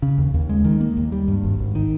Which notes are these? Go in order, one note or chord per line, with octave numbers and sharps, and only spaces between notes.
C#3
D#2
D#2
G#3
D#3
A#3
D#2
G3
G2
G#1
G#1
D#3